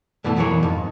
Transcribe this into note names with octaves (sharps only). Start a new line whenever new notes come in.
G2 B2 E3 A3
B1 F2 E3 A#3 C#5
F2 G#2